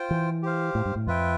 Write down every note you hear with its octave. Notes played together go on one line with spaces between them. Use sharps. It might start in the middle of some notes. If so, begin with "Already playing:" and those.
Already playing: F4 C5 G5
E3
G4 C5 F5
A2
G2
A2
F2 F4 B4 E5 G5